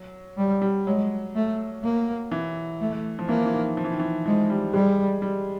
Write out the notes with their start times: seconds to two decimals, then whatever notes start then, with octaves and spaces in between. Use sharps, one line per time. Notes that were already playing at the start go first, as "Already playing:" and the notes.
Already playing: F#3
0.37 G3
0.62 G3
0.87 F#3 G#3
1.35 A3
1.84 A#3
2.32 E3
2.81 A3
3.19 F3
3.29 E3 A#3
3.45 E3
3.53 D#3
3.77 F3
3.84 E3
3.92 D#3
4.00 E3
4.26 F3 G#3
4.50 G3
4.73 G3 G#3
5.22 G3